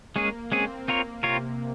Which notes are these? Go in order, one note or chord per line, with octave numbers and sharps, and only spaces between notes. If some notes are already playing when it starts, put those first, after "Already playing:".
G#3 A#3 C#4 G#4
G#3 C4 C#4 G#4
A#3 C4 F4 A#4 C#5
C3 C4 F4 A#4 C#5